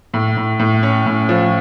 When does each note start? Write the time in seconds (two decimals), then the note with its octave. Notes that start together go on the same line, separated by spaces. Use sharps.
0.14 A2
0.37 A2
0.59 A2
0.83 C#4
1.06 A2
1.29 F3